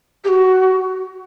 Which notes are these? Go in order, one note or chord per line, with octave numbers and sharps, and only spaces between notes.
G4
F#4